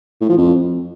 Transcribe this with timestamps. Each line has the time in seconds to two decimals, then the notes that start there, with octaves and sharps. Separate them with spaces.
0.21 A2
0.29 F3
0.37 F2